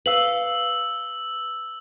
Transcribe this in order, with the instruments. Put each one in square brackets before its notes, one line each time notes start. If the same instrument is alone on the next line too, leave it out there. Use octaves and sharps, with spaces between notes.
[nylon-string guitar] B4 F5 [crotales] E6 F#7